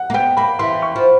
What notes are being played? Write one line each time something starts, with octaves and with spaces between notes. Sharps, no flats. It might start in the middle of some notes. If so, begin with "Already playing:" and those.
Already playing: F#5
A#3
B3 G5
A#3 B5
E3 C6
C#6
F3